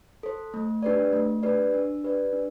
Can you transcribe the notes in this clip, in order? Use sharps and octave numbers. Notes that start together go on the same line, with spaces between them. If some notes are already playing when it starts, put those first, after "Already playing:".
A4 C5
A3
D4 G4 B4 D5
A3
D4 G4 B4 D5
D4
G4 B4 D5
D4